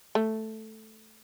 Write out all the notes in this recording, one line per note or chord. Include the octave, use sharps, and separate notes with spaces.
A3